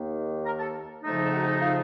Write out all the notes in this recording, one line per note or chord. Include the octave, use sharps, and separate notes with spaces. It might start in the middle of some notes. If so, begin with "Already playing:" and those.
Already playing: D#2 D#3 A#3
A#4 A#5
A4 A5
F2 C#3 F3 A3 D#4
A5
F#4 F#5
F4 F5